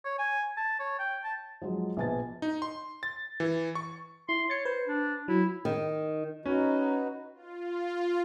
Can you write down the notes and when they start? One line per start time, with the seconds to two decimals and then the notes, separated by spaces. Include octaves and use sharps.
0.05 C#5
0.19 G#5
0.57 A5
0.80 C#5
0.99 G5
1.24 A5
1.62 F3 F#3 G#3
1.97 A#1 B2 B4 G#5 A5 A6
2.42 D#4
2.62 C6
3.03 A6
3.40 E3
3.75 C#6
4.29 E4 C6
4.50 C#5 A6 C#7
4.65 B4 C5
4.87 D4
5.28 F#3 E4
5.65 D#3
6.45 C#4 D#4 F#4 B4
7.34 F4